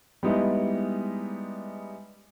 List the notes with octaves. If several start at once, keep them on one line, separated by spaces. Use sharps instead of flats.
G3 G#3 B3 D#4 E4